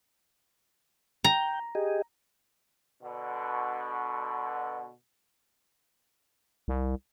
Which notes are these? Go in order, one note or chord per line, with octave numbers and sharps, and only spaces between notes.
G5 A#5
G4 G#4 D#5
B2 D3
C2